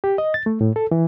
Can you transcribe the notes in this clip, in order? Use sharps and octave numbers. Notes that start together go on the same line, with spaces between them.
G4
D#5
A6
A3
A2
A4
E3